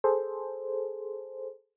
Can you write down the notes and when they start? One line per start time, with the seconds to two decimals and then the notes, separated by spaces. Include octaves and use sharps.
0.04 G#4 A4 C5